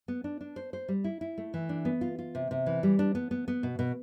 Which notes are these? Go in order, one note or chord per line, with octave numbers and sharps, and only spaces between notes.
B3
D4
D4
C5
C5
G3
E4
E4
A3
E3
D4
B3
F4
F4
C3
C3
E3
G3
D4
B3
B3
B3
B2
B2